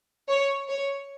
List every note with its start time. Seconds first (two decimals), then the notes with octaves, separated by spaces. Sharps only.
0.29 C#5
0.68 C#5